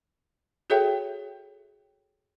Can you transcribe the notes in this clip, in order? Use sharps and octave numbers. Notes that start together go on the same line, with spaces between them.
F#4 G#4 A4 C#5 E5 G5